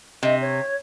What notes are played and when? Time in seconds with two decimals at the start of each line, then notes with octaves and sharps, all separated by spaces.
0.23 C3 D#5
0.41 C#5